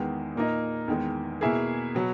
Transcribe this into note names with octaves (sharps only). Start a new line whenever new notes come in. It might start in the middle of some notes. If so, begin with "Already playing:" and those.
Already playing: E2 D#3 G#3 B3
A#2 A#3 D#4
E2 D#3 G#3
B2 A#3 E4 G#4
B2 F#3